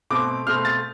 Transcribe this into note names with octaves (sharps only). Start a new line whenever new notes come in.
B2 A3 C4 D6
B2 A3 C4 F6
A6